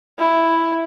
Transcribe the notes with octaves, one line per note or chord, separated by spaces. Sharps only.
E4